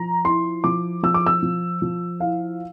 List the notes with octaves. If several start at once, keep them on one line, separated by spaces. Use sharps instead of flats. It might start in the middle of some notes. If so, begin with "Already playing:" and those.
Already playing: F3 A#5
E4 C6
F3 D6
F3 E6
D6
E6
F3
F3
E4 F5